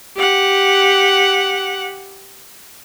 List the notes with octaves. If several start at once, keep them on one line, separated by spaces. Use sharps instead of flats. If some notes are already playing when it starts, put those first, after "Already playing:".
G4 F#5